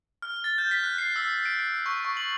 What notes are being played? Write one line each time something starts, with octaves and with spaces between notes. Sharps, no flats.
F6
A6
G6
B6
F#6
C7
E6
D7
C#6
C#6
F#7